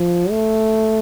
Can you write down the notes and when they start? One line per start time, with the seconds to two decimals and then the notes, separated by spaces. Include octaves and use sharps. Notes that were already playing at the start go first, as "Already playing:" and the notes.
Already playing: F3
0.31 A3